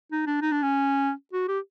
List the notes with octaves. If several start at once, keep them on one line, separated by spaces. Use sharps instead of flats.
D#4
D4
D#4
D4
C#4
F#4
G4